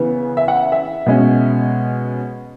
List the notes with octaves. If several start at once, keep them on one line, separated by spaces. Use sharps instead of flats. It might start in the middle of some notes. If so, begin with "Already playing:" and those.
Already playing: C#3 E3 B3
E5
F#5
E5
B2 G#3 C#4